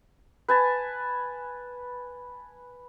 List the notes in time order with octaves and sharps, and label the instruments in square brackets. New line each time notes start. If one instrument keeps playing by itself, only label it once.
[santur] B4 G#5 A5